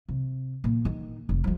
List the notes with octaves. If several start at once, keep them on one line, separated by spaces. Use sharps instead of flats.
C3
A#2
D#3
F1
F3 G#3